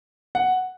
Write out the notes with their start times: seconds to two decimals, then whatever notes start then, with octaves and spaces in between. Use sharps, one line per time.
0.35 F#5